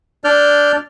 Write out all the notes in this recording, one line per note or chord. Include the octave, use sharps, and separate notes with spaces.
D4 D5 F6 G6